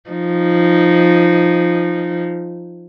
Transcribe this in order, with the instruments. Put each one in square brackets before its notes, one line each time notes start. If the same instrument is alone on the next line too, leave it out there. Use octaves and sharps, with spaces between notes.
[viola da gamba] F3 D#4